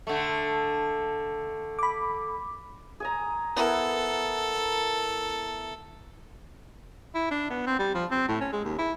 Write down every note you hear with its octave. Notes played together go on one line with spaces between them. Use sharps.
D3 A3
B5 D6
G#4 G#5 A#5
B3 E4 A4 A#4
E4
D4
B3
C4
G3
F3
C4
A2
C#4
G#3
D#2
E4